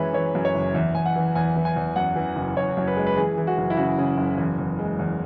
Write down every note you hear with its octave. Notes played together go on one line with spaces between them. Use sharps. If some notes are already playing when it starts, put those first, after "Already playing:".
Already playing: F#2 E3 G#3 B4 C#5 E5
E3 C#5
F#2
C#5
F#1
E2 E5
E2 G#5
F#5
E3
E2 G#5
E3
G#5
E2
F#2 F#5
E3
F#1
F#1 C#5
F#2
B4
G#3
B4
E3 G#4
E3
F#4
F#1
E4
C#3 F#4
C#3
F#1
E2
E2
G#3
E2